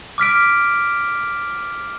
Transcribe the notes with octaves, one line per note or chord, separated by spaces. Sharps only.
D6 F6 B6 D7